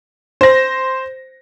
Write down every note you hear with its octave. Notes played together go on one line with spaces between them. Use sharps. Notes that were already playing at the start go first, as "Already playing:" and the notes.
C5 A#6